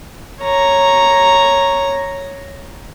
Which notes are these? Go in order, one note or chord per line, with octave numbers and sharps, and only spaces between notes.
C#5 A#5